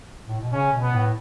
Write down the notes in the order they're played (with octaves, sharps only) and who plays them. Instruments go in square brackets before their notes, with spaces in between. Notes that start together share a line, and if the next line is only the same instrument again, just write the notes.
[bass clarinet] A2
B2
[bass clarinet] C#3 [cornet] C#4
[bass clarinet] B2
[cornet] B3
[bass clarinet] A2